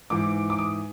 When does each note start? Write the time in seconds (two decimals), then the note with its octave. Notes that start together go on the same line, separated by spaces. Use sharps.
0.10 G#2 E3 D6
0.50 D6
0.59 D#6